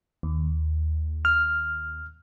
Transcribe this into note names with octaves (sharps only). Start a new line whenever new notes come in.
D#2
F6